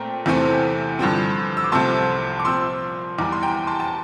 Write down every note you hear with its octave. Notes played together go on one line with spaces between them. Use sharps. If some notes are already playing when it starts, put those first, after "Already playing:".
Already playing: A#2 A3 C4 G5 A#5
E2 C3 E3 A3 C4
G2 D3 F3 C4
E6
D6
C2 C3 F3 A3 C4 A5 C6
D6
A#2 F3 C4 C6 E6
E2 E3 G3 A#5 D6
C6
G5 A#5
A5 C6
A5